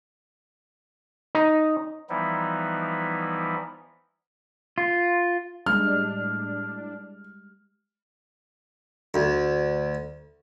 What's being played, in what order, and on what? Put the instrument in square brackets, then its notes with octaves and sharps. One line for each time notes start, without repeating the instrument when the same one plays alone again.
[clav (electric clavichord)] D#4
[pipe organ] E3 F3 G3 B3 D#4 E4
[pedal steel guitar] F4
[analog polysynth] A2 D4 [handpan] G3 G#3 [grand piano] F6
[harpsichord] D2